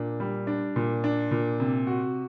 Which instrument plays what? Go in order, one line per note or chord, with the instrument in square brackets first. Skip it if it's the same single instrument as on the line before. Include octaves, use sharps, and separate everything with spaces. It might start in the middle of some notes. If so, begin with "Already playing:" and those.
Already playing: [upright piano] A#2 D4
G3
D4
A#2
D4
A#2
C3
F#4